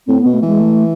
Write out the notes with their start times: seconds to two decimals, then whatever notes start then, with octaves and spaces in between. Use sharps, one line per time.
0.07 A2 C4
0.20 B3
0.25 B2
0.34 A3
0.42 E3 G#3
0.60 A3